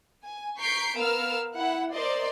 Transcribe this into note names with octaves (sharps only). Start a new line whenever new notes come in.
G#5
A#5 C#6 G6 B6 C7 D7
B3 A#4 F5 E6 F6
E4 F#5
A#4 C5 D5 D#5 C6